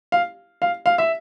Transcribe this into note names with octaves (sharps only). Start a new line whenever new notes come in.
F5
F5
F5
E5